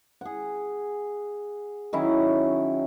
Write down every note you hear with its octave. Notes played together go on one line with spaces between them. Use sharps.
G#4 F#5
D#3 F#3 C#4 E4